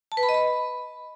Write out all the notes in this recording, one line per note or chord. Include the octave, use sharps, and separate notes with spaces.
A5
B4
B5
D#5
B5